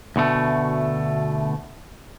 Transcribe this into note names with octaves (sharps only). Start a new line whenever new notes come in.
D2 B2 A3